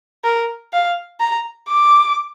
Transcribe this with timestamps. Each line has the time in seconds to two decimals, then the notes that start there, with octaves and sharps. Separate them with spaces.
0.24 A#4
0.73 F5
1.20 A#5
1.69 D6